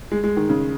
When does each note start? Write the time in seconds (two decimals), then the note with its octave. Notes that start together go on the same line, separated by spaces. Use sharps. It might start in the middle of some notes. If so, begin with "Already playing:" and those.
0.11 G#3
0.24 G#3
0.37 D#3
0.49 C#3